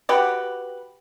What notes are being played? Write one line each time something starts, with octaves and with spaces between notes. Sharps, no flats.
F#4 G4 B4